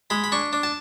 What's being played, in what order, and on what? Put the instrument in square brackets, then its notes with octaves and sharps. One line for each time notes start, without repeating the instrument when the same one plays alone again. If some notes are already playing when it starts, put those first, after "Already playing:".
[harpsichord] G#3 B5
B5
D4 C#6
D4
A5